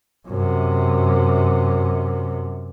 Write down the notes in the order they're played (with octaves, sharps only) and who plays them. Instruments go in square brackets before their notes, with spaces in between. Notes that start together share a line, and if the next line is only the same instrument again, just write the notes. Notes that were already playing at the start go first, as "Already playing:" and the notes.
[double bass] F#2 C3